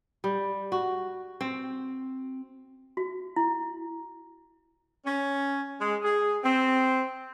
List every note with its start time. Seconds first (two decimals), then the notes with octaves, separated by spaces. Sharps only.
0.24 G3
0.72 F#4
1.41 C4
2.97 F#4
3.36 E4
5.05 C#4
5.81 G#3
6.02 G#4
6.44 C4